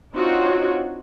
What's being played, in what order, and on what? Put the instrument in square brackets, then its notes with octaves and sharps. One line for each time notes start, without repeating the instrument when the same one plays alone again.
[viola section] C4 D4 D#4 F4 F#4 C#5